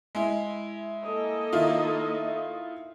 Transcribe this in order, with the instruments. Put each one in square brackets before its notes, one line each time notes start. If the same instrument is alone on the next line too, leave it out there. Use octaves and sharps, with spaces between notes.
[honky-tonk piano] G#3 E4
[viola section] A#3 A4 D#5
[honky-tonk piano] D#3 E4 F4